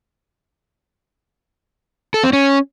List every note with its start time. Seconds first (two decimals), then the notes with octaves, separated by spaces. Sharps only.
2.14 A4
2.24 C4
2.33 C#4